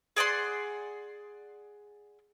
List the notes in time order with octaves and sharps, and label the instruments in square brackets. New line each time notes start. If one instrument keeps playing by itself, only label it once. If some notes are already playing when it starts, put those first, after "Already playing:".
[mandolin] G#4 D5 F#5 C6